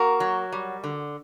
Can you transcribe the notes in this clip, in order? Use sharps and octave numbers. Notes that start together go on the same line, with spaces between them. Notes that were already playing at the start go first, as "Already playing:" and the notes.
Already playing: A#3 F#4 A#4
F#3
G3
D3